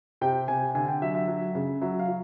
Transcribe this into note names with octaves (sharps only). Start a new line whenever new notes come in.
C3 G5
C3 G#5
D3 G#5
G5
F#3 E5
E5
F#3
C#3
F#3 E5
F5
F#3